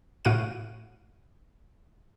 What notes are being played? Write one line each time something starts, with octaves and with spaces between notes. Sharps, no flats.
A2 F#4 F5 F#5 D7 D#7